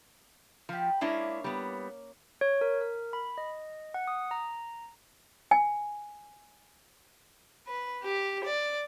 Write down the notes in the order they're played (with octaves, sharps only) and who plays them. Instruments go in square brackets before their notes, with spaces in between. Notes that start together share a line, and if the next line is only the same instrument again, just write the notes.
[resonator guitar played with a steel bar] F3 [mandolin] G4 B4
[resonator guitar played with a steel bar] G#3 D4 E4 [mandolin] A#3 C#4 C#5
[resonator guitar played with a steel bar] G3 B3
[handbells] C#5
A#4
A#4
B5
D#5
F#5
D#6
A#5
[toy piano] G#5
[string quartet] B4
G4
D5